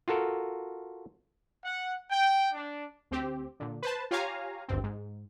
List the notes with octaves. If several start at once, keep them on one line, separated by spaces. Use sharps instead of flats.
F4 F#4 A4 A#4
F#5
G5
D4
D2 C4 G4
A#2 D3
B4 C5 A5
F4 G4 C#5 F5 G#5 A#5
G#1 D2 G2 C4
G#2